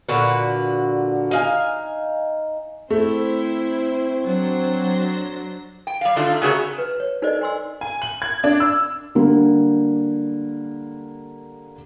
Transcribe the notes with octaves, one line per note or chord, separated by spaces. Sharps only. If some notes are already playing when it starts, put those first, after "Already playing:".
A#2 D3 F#4 B4
D#4 F5 G#5
A3 C4 E4 C5
F#3 D4 C5 A#6
G5
G3 F5
D3 A3 D4 D#4 F4
C#3 A3 F#4 G#4 A#4 C#5
B4
C#5
D#4 A4 A#4 C5 D5 D#5
G#5 C6 E6
G#5
F#7
G#6
D4
E6
D3 G3 A#3